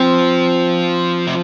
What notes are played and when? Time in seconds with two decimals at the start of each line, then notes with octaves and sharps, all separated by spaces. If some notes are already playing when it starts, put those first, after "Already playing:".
Already playing: F3 C4
1.27 C3